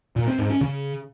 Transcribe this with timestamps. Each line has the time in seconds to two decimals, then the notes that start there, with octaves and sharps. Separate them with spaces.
0.16 A#2
0.27 C4
0.39 G#2
0.50 C#4
0.61 C#3